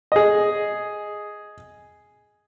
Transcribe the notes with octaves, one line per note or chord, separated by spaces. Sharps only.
G#4 D#5